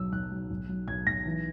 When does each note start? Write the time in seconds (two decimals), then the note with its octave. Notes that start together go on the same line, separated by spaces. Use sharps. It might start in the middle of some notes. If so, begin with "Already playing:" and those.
Already playing: B1 F#3 E6
0.12 B1 F#6
0.31 F#3
0.50 B1
0.69 F#3
0.87 B1 G#6
1.07 B1 A#6
1.25 E3